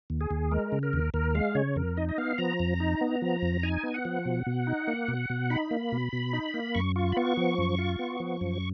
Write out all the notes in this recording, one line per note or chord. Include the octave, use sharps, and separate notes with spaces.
D#2
G#4
D#2
G#3 A#4
C#3
A#4
D#2
D#2 A#4
G#3 F5
C#3 C#5
F2 A#4
D#4 D#5
D#5
B3 F5
F3 A#5
F2
D#4
B3
F3
F2
D#4 G#5
B3
F#5
F3
B2
B2
D#4
A#3
B2
B2
D#4 B5
A#3
B2
B2
D#4
A#3
F#2 C#6
F4 C#6
B5
B3 C#6
F3
F#2
F4
B3
F3
F#2